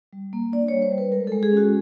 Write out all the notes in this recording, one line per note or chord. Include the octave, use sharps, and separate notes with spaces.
G3
A#3
D4 D5
G3 C#5
C5
G3
B4
G#3 A#4
G#3 A4
G#4
C#4
F#4